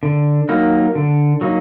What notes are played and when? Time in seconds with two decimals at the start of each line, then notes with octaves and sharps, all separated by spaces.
0.03 D3
0.49 F#3 A#3 D#4
0.95 D3
1.41 F#3 A#3 D#4